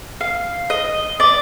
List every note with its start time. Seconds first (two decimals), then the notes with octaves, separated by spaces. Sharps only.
0.21 F5
0.70 D#5
1.20 D5